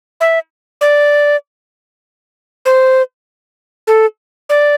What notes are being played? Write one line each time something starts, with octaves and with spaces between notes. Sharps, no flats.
E5
D5
C5
A4
D5